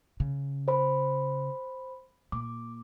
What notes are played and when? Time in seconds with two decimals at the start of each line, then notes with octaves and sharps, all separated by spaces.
0.20 C#3
0.68 C5 B5
2.32 A#2 D6